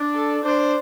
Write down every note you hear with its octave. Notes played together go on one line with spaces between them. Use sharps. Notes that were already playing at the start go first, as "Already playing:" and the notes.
Already playing: D4
A4
D4 C5